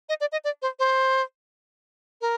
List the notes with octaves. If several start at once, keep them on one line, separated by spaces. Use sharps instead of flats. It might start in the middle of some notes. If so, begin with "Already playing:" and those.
D#5
D5
D#5
D5
C5
C5
A#4